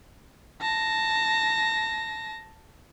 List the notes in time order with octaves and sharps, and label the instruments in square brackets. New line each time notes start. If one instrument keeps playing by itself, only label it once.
[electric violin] A5 A#6